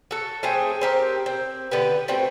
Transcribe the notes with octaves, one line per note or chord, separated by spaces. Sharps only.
F#4 A4
A3 C4 G#4 G5
C4 G4 A#4
C4
D3 B3 G4 B4
A3 C4 F#4 G5